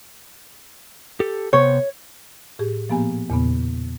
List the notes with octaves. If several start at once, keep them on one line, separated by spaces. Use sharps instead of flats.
G4 A4
C3 B3 C5 C#5
A2 G4 G#4
A#2 F3 A#3 B3 G4 G#5
E2 A#2 C#3 B3